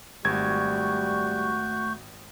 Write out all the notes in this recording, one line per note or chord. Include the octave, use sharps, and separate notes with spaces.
G#1 G3 A3 F#4 C#6 G6 G#6